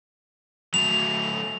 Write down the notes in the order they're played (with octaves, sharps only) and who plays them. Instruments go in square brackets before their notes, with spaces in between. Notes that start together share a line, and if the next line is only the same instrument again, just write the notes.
[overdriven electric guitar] F#3 A3 [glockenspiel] F7